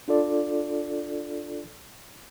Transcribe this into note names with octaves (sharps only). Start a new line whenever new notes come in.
D4 F4 A4 D5